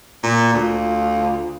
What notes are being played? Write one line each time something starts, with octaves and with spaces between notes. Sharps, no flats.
A#2
D2 F4